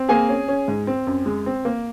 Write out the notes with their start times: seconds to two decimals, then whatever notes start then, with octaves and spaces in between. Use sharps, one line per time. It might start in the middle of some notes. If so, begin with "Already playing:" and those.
Already playing: C4
0.09 A#3 G#4 G#5
0.29 C#4
0.48 C#4
0.68 G#2
0.87 C4
1.07 F#2
1.26 G#3
1.46 C4
1.65 A#3